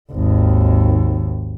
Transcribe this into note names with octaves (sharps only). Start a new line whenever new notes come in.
G#1 D#2